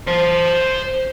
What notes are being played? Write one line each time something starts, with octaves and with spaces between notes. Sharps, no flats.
C5 A5